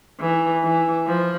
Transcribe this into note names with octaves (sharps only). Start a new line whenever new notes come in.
E3
E3
F3